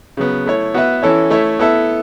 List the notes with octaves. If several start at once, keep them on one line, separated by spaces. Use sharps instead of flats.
C#3 F#3 B3
A3 E4 C#5
B3 F#4 B4 E5
E3 C#4 E4 A4 C#5
A3 E4 C#5 E5
B3 E4 A4 E5